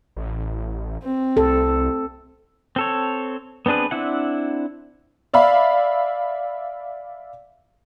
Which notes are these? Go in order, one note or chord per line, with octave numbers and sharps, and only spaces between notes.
A1
C4
C2 A4
C4 A4 C#5
B3 C4 D4 G#4 B4
C4 D4 E4 F#5
D5 E5 F5 B5